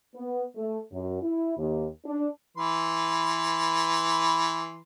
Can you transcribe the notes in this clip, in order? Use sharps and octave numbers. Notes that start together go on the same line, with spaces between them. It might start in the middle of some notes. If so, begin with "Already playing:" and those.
B3
A3
F#2
E4
D#2
D4
E3 B4 C6